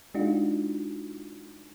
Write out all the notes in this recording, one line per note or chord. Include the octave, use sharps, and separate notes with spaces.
G#3 D4 D#4 F4 F#4